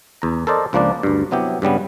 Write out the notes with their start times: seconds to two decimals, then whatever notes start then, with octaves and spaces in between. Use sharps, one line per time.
0.22 E2 A#5
0.47 A4 A#4 C5 D5 D#5
0.73 C#2 F3 A#3 D4 D5
1.03 D2 G2
1.31 C3 F#3 B3 E4 G4
1.62 G2 C#3 G3 B3